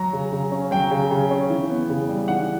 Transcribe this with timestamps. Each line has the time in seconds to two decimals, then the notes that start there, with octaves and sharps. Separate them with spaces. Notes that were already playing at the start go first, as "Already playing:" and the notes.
Already playing: F#3 A#5
0.13 C#3
0.32 C#3
0.52 C#4
0.71 F#3 G5
0.91 C#3
1.11 C#3
1.31 C#4
1.50 E3
1.70 B3
1.89 C#3
2.09 G3
2.28 E3 F#5